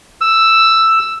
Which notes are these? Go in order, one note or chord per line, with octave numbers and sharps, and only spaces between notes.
E6